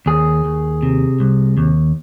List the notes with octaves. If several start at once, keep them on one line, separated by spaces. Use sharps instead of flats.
D#2 G#4
D#2
C3
C2
D#2